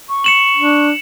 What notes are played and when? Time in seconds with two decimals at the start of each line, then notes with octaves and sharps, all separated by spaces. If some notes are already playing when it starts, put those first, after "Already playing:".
0.08 C#6
0.24 C#7 E7 F#7
0.56 D4